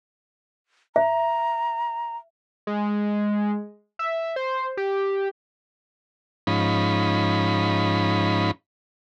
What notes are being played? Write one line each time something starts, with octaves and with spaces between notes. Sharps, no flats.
E5 A#5
G#3
E5
C5
G4
G#2 F3 C#4 D#4 B5